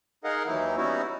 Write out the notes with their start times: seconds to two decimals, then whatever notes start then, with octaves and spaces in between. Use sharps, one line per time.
0.24 D#4 G#4 A#4 D#5 F5 F#5
0.46 D#2 E3 F#3 D#4 E4
0.77 G3 B3 C#4 D#4 E4 F#4